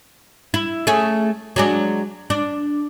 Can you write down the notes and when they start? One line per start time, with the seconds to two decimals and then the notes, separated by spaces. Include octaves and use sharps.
0.54 E4
0.87 A3 C#4 G#4
1.56 F#3 G#3 D4
2.30 D4